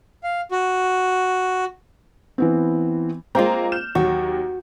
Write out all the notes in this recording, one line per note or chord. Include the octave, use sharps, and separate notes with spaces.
F5
F#4
E3 B3 C4
G#3 A#3 C4 F4 A#5
F6 G6 E7
D#2 F#3 F#4